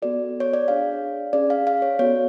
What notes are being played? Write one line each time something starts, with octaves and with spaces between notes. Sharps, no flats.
B3 F#4 A4 D5
C#5
D5
D4 G#4 F5
C#4 G#4 D5
F5
F5
C#5
B3 F#4 A4 C#5